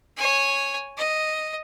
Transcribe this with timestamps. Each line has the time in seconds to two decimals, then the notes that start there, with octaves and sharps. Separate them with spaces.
0.17 C#5 G#5
0.98 D#5